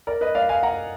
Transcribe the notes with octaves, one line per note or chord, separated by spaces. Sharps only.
A#4 D5
B4 D#5
D5 F5
F5 G#5
F#5 A#5